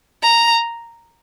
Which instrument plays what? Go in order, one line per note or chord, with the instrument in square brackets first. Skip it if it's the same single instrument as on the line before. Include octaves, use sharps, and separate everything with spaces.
[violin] A#5